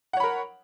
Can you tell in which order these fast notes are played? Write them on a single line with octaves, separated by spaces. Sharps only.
F#5 C#5 B5 A#4